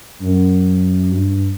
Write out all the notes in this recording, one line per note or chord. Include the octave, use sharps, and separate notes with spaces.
F#2
G2